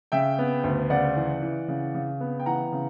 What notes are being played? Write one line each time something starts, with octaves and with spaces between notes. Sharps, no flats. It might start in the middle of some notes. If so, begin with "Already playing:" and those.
C#3 E5 G5
B3
D2
C#3 D5 F#5
E3
E3
C#3
C#3
B3
G5
E3 F#5 A#5
C#3